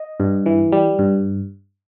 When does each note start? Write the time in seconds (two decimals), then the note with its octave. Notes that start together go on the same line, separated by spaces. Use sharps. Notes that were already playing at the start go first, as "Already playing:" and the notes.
Already playing: D#5
0.20 G2
0.46 E3
0.72 G3
0.99 G2